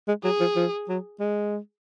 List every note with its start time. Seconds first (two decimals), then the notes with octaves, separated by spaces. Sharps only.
0.08 G#3
0.24 F#3 G#4
0.40 F3
0.56 F3
0.89 F#3
1.20 G#3